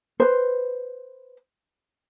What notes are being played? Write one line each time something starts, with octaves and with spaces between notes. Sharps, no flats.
B4 C5